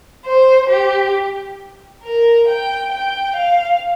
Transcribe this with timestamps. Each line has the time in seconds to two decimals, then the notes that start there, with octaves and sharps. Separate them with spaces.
0.25 C5
0.70 G4
2.03 A#4
2.48 G5
2.92 G5
3.36 F5